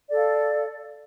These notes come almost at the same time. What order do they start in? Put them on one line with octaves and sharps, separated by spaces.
D5 A4 F5